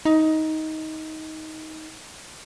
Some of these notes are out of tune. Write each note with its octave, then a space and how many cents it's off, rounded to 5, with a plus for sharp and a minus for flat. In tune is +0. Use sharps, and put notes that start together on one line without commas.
D#4 +15